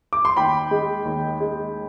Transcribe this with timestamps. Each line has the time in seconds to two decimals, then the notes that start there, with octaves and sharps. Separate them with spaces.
0.13 D6
0.25 C6
0.37 D#2 G5 B5
0.71 G#3
1.05 D#2
1.40 G#3